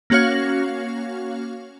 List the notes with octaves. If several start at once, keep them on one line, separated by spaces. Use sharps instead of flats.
A#3 C#4 F#4 C#5 F5